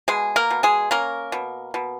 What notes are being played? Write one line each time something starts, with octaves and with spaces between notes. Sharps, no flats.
B2 G#3 G#4
A#3 A#4
B2
G#3 G#4
A#3 C#4 A#4
B2
B2